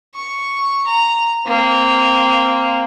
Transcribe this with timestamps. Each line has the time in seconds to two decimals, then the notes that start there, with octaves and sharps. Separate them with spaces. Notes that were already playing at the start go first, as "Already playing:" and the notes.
0.15 C#6
0.87 A#5
1.47 A#3 C4